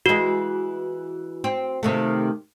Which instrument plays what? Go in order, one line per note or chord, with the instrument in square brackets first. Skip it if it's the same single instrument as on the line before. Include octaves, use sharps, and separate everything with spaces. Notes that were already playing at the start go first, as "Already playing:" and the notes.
[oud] E3 G#3 [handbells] F#4
[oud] C4
C3 D#3 A3